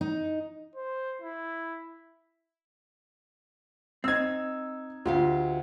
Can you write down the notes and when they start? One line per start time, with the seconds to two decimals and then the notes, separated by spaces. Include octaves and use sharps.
0.01 D#4
0.76 C5
1.22 E4
4.04 C4 D#4 E6 G#6
5.06 D2 F4 G4 F5